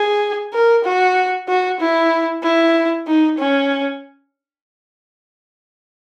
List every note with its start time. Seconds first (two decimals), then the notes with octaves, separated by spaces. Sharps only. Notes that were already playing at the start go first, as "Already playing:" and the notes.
Already playing: G#4
0.53 A#4
0.84 F#4
1.48 F#4
1.80 E4
2.43 E4
3.07 D#4
3.38 C#4